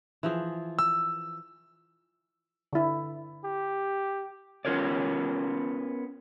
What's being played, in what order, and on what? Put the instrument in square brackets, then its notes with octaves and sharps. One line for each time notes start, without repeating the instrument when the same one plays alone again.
[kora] E3 F3 G#4
[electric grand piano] E6
[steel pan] D3 E4
[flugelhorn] G4
[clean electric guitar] B3 C#4 F4 A#4 C#5 D5